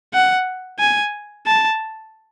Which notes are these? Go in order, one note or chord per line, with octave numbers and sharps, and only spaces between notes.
F#5
G#5
A5